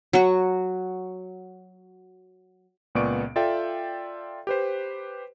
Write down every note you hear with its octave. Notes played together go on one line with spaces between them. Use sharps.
F#3 F#4
C#2 A#2 B3 D5 C#6 D7
F4 A4 D5 E5 G5
G4 B4 C5